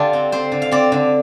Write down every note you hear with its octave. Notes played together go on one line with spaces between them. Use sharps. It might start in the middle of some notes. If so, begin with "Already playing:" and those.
Already playing: D3 D4 F4 G4 A4
C4
C4 C5
D3
F5
C4 D5
D3